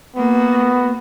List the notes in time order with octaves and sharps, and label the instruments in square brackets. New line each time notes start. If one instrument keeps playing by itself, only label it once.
[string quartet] A#3 F#4 [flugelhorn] B3